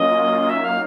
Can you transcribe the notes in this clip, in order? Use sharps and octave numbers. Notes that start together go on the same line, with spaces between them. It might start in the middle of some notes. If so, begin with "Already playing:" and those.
Already playing: F#3 A#3 C#4 F4 D#5
F#3 A#3 D#4 E5
F5